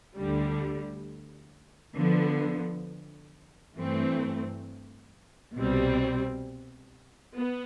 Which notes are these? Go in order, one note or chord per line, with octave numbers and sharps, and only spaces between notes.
D2 D3 G3
D3 F3 B3
G2 E3 A3 C4
C2 B2 G3 C4
B3